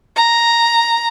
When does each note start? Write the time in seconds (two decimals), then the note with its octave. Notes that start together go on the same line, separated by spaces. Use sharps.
0.16 A#5